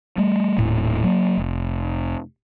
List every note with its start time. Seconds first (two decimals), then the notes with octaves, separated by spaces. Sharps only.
0.18 G3 A3
0.58 D#1 A2
1.04 F#3 A#3
1.37 F1